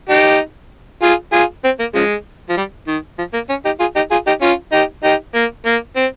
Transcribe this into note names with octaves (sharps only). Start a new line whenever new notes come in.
D#4 G4
F4 G#4
F4 G#4
C4
A#3
C#3 F3 G#3
F3
G3
D#3
F3
A#3
C#4
D#4 G4
F4 G#4
D#4 G4
F4 G#4
D#4 G4
C#4 F4
D#4 G4
D#4 G4
A#3
A#3
C4